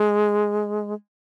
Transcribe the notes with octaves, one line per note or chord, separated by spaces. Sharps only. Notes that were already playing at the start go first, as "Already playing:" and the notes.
Already playing: G#3